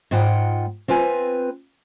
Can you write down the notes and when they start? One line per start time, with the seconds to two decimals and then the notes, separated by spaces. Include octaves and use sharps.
0.11 G#2 F4 F#5 G5
0.88 C4 F4 B4 G#5